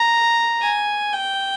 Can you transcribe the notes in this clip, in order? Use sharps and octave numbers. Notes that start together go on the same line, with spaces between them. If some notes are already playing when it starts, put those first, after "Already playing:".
Already playing: A#5
G#5
G5